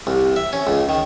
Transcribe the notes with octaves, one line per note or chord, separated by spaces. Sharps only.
C2
E5
C#4
C#2
D#3